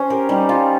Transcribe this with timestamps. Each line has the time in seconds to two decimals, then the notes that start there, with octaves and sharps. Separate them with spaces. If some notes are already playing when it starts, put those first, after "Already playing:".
Already playing: C#4 C5
0.10 G4 A#4
0.29 G3 D#4 G4
0.49 F4